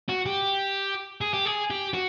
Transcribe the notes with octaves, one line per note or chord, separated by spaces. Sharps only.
F#4
G4
G#4
G4
G#4
G4
F#4